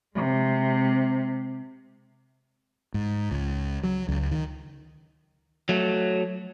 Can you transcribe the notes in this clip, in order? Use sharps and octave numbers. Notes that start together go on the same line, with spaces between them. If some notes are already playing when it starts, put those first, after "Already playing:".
C3 G#3
G#2
C#2
F#3
C#2
D#3
F#3 A3